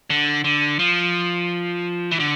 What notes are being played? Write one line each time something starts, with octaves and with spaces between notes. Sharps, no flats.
D3
D3
F3
E3
D3